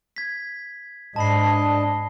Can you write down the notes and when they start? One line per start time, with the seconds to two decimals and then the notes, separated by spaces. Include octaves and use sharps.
0.16 G#6 B6
1.16 G#2 D4 D#5 A5 B5 C7